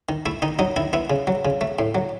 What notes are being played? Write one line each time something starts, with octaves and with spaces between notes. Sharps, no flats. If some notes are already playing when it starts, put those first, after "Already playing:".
D#3
A3 E4
D#3 D#4
F#3 D#4
D#3 E4
B3 E4
C#3
F#3
C#3
A3
A2
F#3